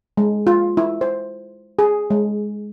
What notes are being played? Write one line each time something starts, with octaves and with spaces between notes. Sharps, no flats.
G#3
F4
E4
C5
G#4
G#3